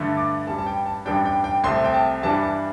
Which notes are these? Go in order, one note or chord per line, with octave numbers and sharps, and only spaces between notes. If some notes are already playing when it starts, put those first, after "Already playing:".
Already playing: G2 D3 A3
D6
A1 G2 G3 A5
A5
G5
A5
A1 G2 G3 D4 G5
G5
G5
C2 C3 A3 C6
G5
A5
G2 E3 G3 D4 A5
A5